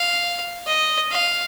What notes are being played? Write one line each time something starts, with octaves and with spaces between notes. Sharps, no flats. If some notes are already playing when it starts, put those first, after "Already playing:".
Already playing: F5
D#5
F5